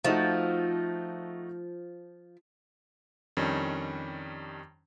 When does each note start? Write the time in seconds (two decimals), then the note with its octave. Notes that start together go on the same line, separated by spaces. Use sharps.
0.05 F3 A3 D#4 F#4
3.37 F2 D#3 G3 C#4 D4